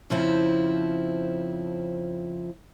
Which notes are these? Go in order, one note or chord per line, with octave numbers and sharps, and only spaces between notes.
F2 C#3 F3 C4 E4